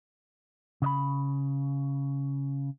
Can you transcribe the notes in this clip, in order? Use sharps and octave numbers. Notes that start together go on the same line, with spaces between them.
C#3 D#5 B5